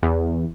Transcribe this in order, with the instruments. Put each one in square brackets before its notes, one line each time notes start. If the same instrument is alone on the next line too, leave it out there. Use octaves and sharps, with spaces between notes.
[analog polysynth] E2